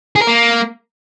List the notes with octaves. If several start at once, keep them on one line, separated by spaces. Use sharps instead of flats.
G#4
A#4
A#3